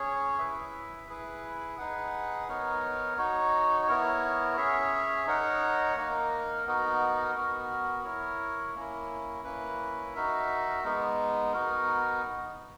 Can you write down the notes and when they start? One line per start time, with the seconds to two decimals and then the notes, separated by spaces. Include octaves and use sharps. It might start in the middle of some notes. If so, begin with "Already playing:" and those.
Already playing: C#4 G#4 C#5
0.39 E4 B4 E5
1.08 E4 G#4 B4
1.78 D#4 G#4 B4 F#5
2.48 B3 D#4 A#4 C#5
3.17 D#4 F#4 C#5
3.87 B3 E4 A#4 C#5
4.57 C#4 G#4 C#5 E5
5.27 D#4 A#4 C#5 F#5
5.97 A#3 D#4 A#4
6.66 B3 D#4 F#4 A#4
7.35 B3 F#4 A#4
8.05 E4 A#4 C#5
8.74 A#3 C#4 E4
9.44 A#3 C#4 E4 B4
10.14 D#4 F#4 A#4 E5
10.84 G#3 B3 D#4
11.53 B3 D#4 F#4 A#4